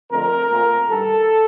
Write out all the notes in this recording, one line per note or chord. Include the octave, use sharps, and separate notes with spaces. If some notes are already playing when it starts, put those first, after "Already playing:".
F2 D3 A3 C4 A#4
A#2 A3 C4
G2 D#3 G3 A4